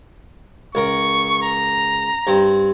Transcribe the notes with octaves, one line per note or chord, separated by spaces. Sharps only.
C#2 A#4 C#6
A#5
G2 C4